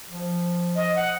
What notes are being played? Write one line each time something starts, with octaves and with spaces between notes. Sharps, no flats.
F3
D#5
F#5